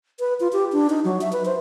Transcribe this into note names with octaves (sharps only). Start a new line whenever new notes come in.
B4
F4
G4
D4
D#4
F#3
E5
B4
C5